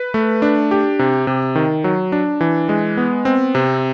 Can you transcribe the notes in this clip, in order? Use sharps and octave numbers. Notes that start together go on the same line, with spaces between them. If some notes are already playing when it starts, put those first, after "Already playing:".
Already playing: B4
A3
D4
G4
C3
C3
D#3
F#3
D4
E3
G#3
B3
C4
C3